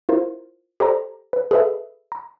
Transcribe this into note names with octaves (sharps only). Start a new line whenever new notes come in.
E4 F4 A#4 C5
G4 A4 C5 D5 A#5
B4
G#4 A4 B4 D#5 E5
A#5